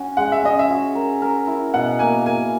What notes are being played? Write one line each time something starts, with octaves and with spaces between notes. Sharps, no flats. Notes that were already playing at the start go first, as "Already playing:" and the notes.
Already playing: C#4 F#4
G#3 F#5
E5
C#4 D#5
E5
F#4
A#4
A#4
E4
B2 F#5
A#3 G#5
A#4 G#5